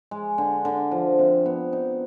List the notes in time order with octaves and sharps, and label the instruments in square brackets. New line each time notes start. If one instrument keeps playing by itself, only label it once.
[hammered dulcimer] G#3
D3
D3
F3
C3
B3
D#4